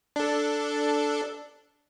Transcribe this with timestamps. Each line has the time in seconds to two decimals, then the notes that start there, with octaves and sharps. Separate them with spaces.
0.16 D4 A4